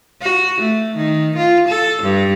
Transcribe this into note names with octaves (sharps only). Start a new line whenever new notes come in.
F#4
A3
D#3
F4
A4
G2